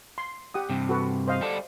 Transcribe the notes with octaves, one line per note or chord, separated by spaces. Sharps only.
C6
G4 F#5 D#6
G2 C3
F#4 A4 B4
C5 D#5 F5
G3 A4 D5